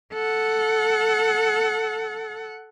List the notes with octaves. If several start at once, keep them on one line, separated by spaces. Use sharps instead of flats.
A4 F#5